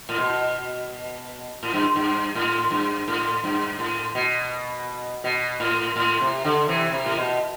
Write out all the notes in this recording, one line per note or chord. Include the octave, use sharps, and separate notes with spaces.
A2
B2
A2
G2
G2
A2
G2
A2
G2
A2
B2
B2
A2
A2
C3
D3
C3 E3
C3
A2
B2